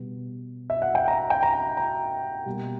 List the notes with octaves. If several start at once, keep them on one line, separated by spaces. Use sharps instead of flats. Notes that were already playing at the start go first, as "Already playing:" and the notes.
Already playing: B2 G3 B3
E5
F#5
G5
A#5
G5
A#5
A#5
B2 G3 A#3